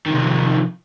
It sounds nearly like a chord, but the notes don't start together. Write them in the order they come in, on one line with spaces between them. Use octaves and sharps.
D#3 C3 D#4 F3